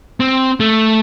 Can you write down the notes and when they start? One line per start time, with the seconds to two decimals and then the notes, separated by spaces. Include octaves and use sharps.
0.20 C4
0.60 A3